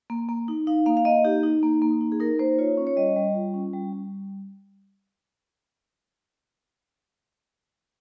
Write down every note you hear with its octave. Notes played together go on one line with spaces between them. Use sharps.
A#3
A#3
D#4
D#4 F5
A#3 F5
F5
A#3 D#5
D#4 G4
D#4
A#3
A#3
D#4
G#4
D#4 A#4
A#3 C5
F4 C#5
C#4
C#5
G3 D#5
G3
F4
C#4
G3
G3